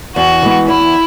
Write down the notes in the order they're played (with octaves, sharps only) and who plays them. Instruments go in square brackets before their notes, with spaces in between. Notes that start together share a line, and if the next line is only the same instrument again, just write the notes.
[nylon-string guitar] E2 [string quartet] F#4
[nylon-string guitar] E3 G#3 B3
[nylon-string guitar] E2 [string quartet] E4